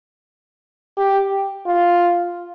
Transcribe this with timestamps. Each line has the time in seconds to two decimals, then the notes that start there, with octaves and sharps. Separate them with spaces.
0.97 G4
1.66 F4